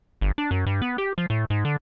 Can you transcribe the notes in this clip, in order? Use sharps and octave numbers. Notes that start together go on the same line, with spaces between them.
G1
D4
F#2
G2
B3
G4
F3
A2
G#2
D3